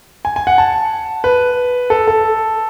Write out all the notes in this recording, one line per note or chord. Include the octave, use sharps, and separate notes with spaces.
G#5
G#5
F#5
A5
B4
A4
A4